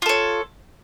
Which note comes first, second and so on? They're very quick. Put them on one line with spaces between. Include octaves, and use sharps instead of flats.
F4 A4 C#5